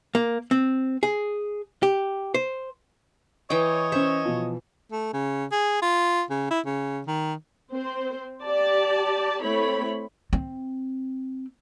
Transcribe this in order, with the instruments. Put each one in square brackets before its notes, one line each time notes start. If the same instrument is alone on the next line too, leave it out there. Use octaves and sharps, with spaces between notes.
[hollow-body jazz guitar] A#3
C4
G#4
G4
C5
[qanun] E3 G5 [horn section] C#5 D#5
[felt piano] C#4 C5 [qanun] E5
[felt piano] B2 F3
[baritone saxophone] A3
C#3
G#4
F4
C#3
E4
C#3
D#3
[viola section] C4 C5
G4 D5 A5
A3 C4 E4 C#5 B5
[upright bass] C4